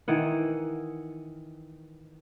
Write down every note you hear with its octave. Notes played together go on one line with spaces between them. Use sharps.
D#3 E3 F#5